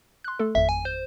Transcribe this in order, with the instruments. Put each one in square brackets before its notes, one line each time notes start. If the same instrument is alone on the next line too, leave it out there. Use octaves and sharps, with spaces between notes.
[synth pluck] C6 F#6
A3 A4
[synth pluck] G#1 F2 [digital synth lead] E5
[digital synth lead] G#5
C5